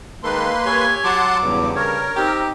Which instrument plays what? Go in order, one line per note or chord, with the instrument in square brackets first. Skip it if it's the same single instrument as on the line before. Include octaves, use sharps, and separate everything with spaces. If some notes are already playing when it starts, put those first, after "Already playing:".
[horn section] D#3 G#3 A4 [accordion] A#3 B4 C6
[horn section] G4 E5 G#5 [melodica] C#5
[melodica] F#3 D6 [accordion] F#5 A5 C6
[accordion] E2 [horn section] G2 C#3
[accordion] A#4 [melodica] C#5
[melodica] C4 [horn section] D#4 G4